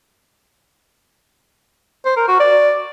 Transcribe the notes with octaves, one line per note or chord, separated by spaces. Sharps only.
C5
A#4
F#4
D5